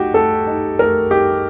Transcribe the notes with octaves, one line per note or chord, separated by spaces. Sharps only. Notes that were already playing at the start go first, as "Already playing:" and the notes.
Already playing: A3 D#4 F#4 G4
A3 A4
D#4
A3 A#4
D#4 G4